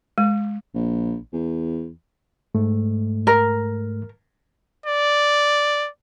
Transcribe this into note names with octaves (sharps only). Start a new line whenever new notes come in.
G#3
A#1
E2
G#2 A3
A#4
D5